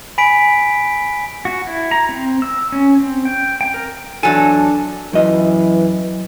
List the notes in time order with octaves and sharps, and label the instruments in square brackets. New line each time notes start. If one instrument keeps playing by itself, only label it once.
[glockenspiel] G#5 B5 B6 D7
[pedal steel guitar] F#4
E4
A#5
C4
E6
C#4
C4
G5
G5
A#4
[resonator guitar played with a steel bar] E2 F#3 A4 [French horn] D4 [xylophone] G#5
[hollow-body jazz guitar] F#2 D#5 [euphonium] E3